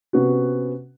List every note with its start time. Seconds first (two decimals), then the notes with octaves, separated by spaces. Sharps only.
0.13 C3 B3 C#4 F#4